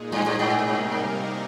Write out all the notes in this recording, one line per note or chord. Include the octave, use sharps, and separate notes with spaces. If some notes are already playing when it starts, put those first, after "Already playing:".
Already playing: A#2 G#3 D#4 G#4
G2
G2
G#2
C3 G3 A#3 D#4 A#4